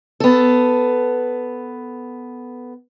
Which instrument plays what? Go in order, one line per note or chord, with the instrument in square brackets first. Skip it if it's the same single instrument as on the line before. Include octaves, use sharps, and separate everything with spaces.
[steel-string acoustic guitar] B3 A4